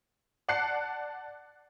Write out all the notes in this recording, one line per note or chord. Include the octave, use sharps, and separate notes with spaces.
D5 F#5 A5 F#6 C7 C#7